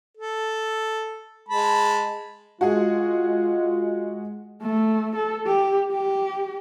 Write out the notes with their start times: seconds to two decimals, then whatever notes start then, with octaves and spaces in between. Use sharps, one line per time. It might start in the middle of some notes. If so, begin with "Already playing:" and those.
0.17 A4
1.49 G#3 A5 B5
2.61 G#3 F4 F#4 G#4
4.62 A3
5.16 A4
5.46 G4
5.92 G4